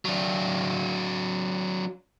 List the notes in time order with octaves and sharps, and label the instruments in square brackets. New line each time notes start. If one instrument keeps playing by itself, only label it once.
[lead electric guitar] F#3 D4